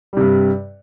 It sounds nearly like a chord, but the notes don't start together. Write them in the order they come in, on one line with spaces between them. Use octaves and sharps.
G3 C3 G2